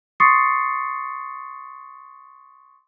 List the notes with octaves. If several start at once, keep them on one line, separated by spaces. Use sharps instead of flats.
C6 C#6 D#6 A6 C7 C#7